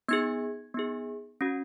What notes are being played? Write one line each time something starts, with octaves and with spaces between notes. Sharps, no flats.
B3 D#4 G#4 G#6
B3 D#4 G#4
C#4 F#4